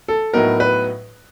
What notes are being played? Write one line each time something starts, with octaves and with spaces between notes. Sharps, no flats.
A4
A2 F#3 B3 D#4 A#4
B4